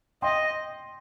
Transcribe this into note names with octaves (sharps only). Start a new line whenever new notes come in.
D#5 G5 C6